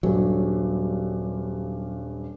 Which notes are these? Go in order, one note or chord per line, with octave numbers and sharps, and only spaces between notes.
D#1 G2 F#3